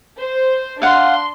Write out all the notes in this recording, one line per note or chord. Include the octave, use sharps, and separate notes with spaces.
C5
D4 F5 F#5 C6